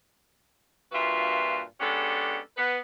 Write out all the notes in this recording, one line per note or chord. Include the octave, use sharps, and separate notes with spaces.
G2 A#2 F4 F#4 B4 E5
G#3 B3 C#4 D4 G4 A4
B3 B4